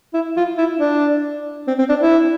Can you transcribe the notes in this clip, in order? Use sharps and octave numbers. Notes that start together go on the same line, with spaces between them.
E4
F4
E4
D4
C4
C4
D4
E4